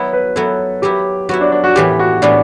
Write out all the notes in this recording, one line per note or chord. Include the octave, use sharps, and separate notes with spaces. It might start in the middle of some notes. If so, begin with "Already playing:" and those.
Already playing: F#3 B3 E4
B4
F#3 B3 E4 A4
F#3 B3 E4 G4
F#3 B3 E4 F#4
D4
D4
F#4
A2 E3 B3 G4
F#4
A2 E3 B3 D4